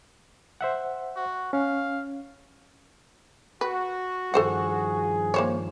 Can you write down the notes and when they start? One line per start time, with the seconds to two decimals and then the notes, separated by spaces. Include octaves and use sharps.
0.61 C5 E5 F#5
1.16 F#4
1.53 C#4 F5
3.61 F#4 B4
4.34 G2 D#3 F3 G#4 A4 C5 F#5
5.34 A#3 C5 C#5